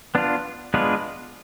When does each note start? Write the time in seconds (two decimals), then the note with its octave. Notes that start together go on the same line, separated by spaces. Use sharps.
0.15 B3 D4 F4
0.74 G#3 B3 D4 F4 B4